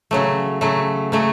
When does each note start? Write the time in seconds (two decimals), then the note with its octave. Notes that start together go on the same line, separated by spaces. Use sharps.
0.11 C#3 F#3 A3
0.61 C#3 F#3 A3
1.12 C#3 F#3 A3